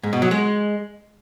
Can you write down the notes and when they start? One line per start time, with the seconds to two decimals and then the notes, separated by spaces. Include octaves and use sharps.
0.03 G#2
0.13 B2
0.22 F#3
0.31 G#3